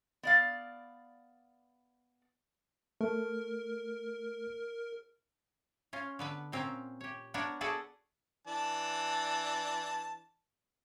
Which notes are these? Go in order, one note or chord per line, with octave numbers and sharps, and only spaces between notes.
B3 D5 F5
A3 A#4
C#4 F4
D3 B3 B4
A#2 C4 C#4 A#5
G4 C#5
B3 D4 A#4 C#5 F#5
F#4 G#4 A4 B4 D5 F#5
E3 D4 A5